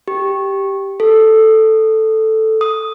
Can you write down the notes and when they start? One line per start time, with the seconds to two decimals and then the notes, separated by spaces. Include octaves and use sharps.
0.08 G4
1.00 A4
2.61 D#6